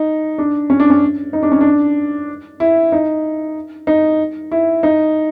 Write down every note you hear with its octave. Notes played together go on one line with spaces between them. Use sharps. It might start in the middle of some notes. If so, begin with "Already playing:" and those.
Already playing: D#4
D4
C#4
D4
C#4
D#4
D4
C#4
D4
E4
D#4
D#4
E4
D#4